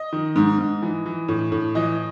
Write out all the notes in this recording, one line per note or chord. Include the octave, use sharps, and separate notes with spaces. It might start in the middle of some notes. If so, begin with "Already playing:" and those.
Already playing: D#5
D#3
G#2
G#2
E3
E3
A2
A2
E3 D#5